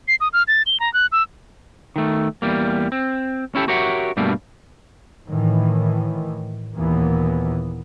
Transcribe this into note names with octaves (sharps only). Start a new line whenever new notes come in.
C7
D#6
F6
A6
G7
A#5
F#6
E6
D#3 A3
E2 G3 A#3
C4
C#4 E4 G4 A4
F#4 G4 A#4 C#5 E5 F#5
G2 B2 G3 A3 A#3
A2 D#3 E3
D#2 A#2 E3 A#3 B3